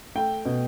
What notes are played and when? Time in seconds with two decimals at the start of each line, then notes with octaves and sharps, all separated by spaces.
0.15 A3 G5
0.45 B2